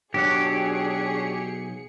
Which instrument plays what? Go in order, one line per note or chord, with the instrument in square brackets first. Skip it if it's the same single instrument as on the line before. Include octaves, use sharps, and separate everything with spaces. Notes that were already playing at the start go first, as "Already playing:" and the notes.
[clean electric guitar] B1 F#3 F#5 [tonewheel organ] D4 C#5 [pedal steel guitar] G4 [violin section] G#4 C#7